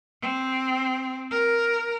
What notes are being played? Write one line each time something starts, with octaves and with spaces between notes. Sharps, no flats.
C4
A#4